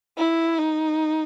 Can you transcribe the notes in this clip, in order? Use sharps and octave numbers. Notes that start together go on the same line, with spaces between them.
E4
D#4